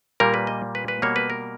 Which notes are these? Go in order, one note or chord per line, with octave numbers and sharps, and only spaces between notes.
A#2 G3 A#3 A#4
B4
D#5
B4
B4
B2 G3 A#3 C#5
B4
A#4